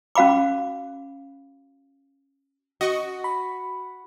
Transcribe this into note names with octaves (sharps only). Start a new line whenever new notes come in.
C#4 F#4 F5 B5 D6
F#4 D#5 C#6
B5